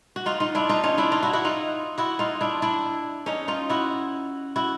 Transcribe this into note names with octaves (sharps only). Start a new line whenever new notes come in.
F#4
D#4 F4
D#4 F4
D4 E4
D#4 F4
C#4 D#4
D4 E4
D#4 F4
E4 F#4
E4 F#4
D#4 F4
E4 F#4
D#4 F4
D4 E4
D4 E4
C#4 D#4
D#4 F4
E4 F#4
E4 F#4